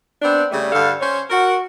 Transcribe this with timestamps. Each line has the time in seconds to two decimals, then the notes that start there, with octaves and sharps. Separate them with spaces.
0.22 B3 C4 D4
0.51 C#3 G3 A3
0.72 G2 D3 A4 F5
1.00 C#4 C5 C#5
1.29 F#4 A#4